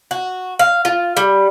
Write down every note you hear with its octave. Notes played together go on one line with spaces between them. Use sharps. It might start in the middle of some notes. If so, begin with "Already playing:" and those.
F#4
F5
F4
G3